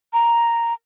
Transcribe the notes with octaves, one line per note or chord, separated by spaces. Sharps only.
A#5